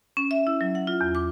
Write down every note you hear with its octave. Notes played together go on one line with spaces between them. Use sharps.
C#4
E5
E4
F#3
F#5
F4
E2
D6